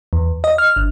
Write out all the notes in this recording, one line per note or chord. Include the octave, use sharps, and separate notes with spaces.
E2
D#5
F6
G1